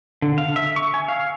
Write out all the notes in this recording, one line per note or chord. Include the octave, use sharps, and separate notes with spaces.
D3
F5
E5
C#6
G#5
F5